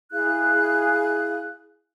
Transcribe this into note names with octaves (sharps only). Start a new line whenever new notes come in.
E4 G#4 F5 F#6